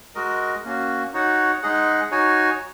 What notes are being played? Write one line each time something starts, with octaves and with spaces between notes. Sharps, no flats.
G#3 F#4 A#4 D#5
A#3 C#4 F#4
D#4 F#4 C#5 F#5
G#3 D#4 G#4 D#5 F#5
D#4 F#4 C#5 G#5